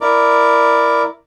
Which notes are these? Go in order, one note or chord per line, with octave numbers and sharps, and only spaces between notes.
E4 A#4 D5